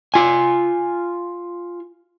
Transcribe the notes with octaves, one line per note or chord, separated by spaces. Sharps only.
F4 G#5